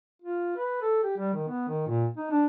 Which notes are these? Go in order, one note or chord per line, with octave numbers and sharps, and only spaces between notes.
F4
B4
A4
G4
G3
D#3
B3
D#3
A#2
D#4
D4